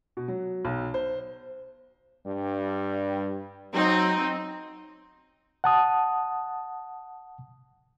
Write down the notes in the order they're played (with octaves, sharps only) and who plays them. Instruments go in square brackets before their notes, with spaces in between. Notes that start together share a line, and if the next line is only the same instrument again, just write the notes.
[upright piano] B2
F#3
B1
C5
[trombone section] G2 G3
[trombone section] F#3 [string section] C4 D#4
[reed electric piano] F#5 A5 D#6